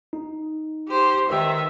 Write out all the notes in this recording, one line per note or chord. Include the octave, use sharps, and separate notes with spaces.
D#4
G4 C5
D#3 B4 E5 G5